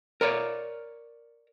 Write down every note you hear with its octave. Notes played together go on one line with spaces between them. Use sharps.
A#4 C#5 D5